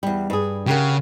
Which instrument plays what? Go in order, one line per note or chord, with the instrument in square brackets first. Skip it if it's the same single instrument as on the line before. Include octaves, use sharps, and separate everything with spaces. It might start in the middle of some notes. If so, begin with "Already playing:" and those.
[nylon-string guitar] E2 G3
G2 G#4
[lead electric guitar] C#3 [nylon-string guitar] G4 A#4 F#5